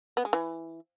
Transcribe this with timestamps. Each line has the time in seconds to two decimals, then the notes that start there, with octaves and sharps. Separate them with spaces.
0.17 B3
0.25 G#3
0.33 E3